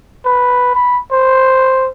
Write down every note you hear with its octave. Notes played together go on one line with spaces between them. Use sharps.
B4
B5
C5